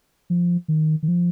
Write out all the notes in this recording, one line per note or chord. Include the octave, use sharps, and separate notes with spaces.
F3
D#3
D#3
F3